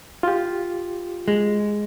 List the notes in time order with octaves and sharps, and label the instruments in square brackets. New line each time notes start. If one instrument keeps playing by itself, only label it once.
[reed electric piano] F4 G4
[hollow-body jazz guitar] G#3